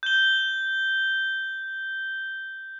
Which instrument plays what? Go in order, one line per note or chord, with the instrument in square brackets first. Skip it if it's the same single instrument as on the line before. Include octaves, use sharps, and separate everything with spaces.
[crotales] G6 G7